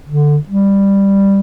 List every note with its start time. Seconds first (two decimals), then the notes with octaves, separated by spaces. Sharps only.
0.09 D3
0.48 G3